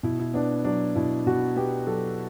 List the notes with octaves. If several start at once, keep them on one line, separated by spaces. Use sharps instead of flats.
B2 E4
E4
B3 D4
F#3 D4
B2 E4
B2 F#4
B3 G4
F#3 A4